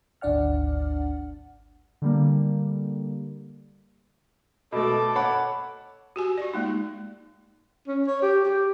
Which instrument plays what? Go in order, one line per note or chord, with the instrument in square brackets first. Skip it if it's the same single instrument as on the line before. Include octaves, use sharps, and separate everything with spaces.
[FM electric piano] G#1 D2 D4 D5 F#5 F6
[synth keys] D3 G3 A#3
[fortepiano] B2 A3 [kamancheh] A4 D6
[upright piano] C#5 F#5 B5
[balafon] F#4 G4 G#5
F4 D5
G#3 A#3 D#4
[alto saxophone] C#4
C#5
G4
G4